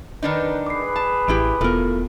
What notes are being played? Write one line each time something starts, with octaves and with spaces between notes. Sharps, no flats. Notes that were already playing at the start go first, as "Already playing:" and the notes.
D#3 D4 D#4 B4
G#4 B4 D6 C7
A5
A1 A3 E4 G4
E1 A2 B3 F4 A4 A#4